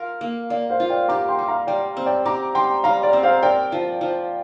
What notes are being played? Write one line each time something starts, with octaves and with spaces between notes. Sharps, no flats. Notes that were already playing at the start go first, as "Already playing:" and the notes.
Already playing: F4 A#4
A#3
A#3 D5
C5 F5
F4
D5 G5
G4 A#5 D6
G5 C6
G3
F5 A#5
G3 D5 G5
C4
D5 G5
G4 A#5 D6
G3 G5 C6
G3 F5 A#5
D5
C4
C5 F5
A#4 D5 G5
F3
F3